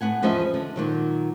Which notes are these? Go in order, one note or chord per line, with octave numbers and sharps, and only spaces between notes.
A2 B3 F#5 G#5
E2 F3 C#4 B4 D#5 E5
D3
A#2 D#3 F#3